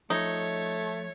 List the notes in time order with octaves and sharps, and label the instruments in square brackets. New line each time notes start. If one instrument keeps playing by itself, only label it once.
[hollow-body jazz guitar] F3 [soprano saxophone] A3 [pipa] D#4 [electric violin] C#5